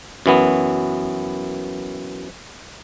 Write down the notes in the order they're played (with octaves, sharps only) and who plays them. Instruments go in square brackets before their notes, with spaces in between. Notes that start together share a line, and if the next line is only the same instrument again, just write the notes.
[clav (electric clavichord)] F#2 E3 B3